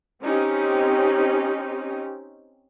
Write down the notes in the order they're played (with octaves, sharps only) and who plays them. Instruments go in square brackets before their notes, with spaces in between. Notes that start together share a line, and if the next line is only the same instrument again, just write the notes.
[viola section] C4 C#4 D#4 G4